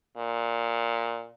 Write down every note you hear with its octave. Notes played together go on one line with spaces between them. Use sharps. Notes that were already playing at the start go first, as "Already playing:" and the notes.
A#2